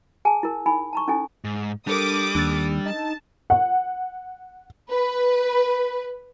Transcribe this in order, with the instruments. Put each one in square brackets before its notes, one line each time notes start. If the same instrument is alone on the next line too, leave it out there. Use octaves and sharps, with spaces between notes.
[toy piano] G#4 G#5 A5
E4 A#4
D#4 G#5 B5
A5 A#5 C#6
C#4 D#4 E4 A4 G#5
[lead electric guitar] G#2
[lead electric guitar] G3 [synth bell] D4 A4 A#4 [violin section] D6 D#6
[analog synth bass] D#2 [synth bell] D4 E6 A6
[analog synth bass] D#4 [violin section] A5
[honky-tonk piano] F#5
[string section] B4